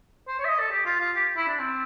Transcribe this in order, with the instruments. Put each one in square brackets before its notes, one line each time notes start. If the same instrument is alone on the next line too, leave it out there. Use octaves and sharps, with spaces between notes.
[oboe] C5
C#5
E5
D#5
A4
G4
F4
F4
G4
E4
D4
C4